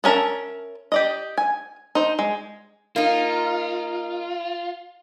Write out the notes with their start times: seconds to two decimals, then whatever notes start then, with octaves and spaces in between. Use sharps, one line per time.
0.04 B3 C#4 A#4 E5 A5
0.92 G4 D5 D#5
1.38 G#5
1.95 D#4 C5
2.19 G#3
2.96 A#3 D#4 F4